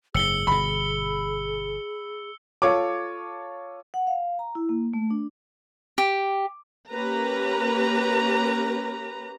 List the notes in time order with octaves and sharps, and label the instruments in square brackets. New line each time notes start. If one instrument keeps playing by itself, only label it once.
[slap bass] F#1 G#2 [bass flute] G#4 [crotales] E6 C#7 G7
[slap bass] G1 B2 [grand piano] B5
[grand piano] F4 A4 C#5 A5 D6
[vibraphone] F#5
F5
A#5
E4
A#3
A3
D4
[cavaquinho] G4
[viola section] A#3 C#4 G4 B4 A#5